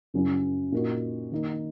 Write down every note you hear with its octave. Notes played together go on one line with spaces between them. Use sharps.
F#2 C#3 F#3 C#4 E4
A#2 A#3 D#4 F#4
D#3 A#3 D#4